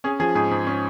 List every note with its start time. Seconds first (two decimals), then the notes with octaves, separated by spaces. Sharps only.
0.04 C#4 G#4
0.20 F3 G#4
0.35 G#2 G#4
0.51 G#2
0.67 C#4